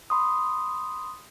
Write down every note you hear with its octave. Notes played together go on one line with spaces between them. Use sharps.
B5 C6 D#6